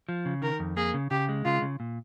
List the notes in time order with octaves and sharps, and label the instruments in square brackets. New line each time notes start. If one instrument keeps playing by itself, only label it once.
[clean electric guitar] F3
C#3
[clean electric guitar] D#3 [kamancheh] A#4
[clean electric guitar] F2
[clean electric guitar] A#3 [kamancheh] G#4
[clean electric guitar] C#3
[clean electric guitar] C#3 [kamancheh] G4
[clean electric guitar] G#3
[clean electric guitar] C#3 [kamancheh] F4
[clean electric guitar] C#3
A#2